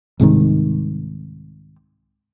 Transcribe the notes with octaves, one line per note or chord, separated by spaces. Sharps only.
C2 G#2 C3 D#3